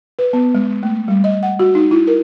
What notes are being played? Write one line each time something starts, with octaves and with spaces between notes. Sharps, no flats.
B4
B3
G#3
A3
G3
D#5
F#5
F#4
D#4
E4
A#4